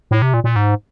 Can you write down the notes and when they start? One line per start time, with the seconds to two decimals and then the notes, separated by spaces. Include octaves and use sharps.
0.11 A2
0.22 C3
0.34 A#2
0.44 A#2
0.56 G#2